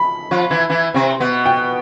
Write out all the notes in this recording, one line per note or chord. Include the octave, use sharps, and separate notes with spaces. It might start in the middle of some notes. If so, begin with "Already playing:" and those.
Already playing: B5
F3 F4
E3 E4
E3 E4
C3 C4
B2 B3
G5